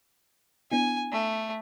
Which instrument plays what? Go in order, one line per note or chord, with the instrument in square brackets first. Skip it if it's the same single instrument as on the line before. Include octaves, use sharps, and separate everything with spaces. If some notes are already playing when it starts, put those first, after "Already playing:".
[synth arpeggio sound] B3 D4 E4 [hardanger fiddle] G#5
[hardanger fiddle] A3